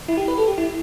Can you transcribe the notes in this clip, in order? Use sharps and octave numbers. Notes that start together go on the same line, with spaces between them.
E4
G4
B4
A4
G4
E4